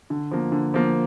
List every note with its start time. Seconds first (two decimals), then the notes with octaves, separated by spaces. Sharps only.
0.10 D3
0.31 F3 A#3
0.52 D3
0.74 F3 A#3